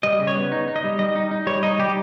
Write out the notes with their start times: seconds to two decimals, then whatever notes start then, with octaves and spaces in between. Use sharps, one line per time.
0.03 G3 D#5
0.19 C#3
0.27 C#5
0.36 B3
0.52 D#4
0.68 D#4
0.76 D#5
0.84 G3
0.99 G3 D#5
1.16 D#4
1.31 D#4
1.47 G3 C#5
1.63 D#4 D#5
1.79 G3 G4